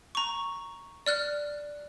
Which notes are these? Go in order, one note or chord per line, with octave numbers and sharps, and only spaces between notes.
A#5 C#6
D5 F6 F#6